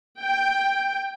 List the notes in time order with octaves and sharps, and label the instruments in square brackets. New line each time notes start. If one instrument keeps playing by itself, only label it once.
[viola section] G5